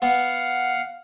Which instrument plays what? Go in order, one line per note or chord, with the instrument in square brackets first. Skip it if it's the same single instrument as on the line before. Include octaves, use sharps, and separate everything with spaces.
[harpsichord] B3 [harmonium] F5 F#5